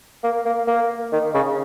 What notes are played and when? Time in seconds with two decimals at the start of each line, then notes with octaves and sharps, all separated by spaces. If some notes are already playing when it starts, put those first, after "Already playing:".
0.24 A#3
0.46 A#3
0.67 A#3
1.12 D#3
1.34 C#3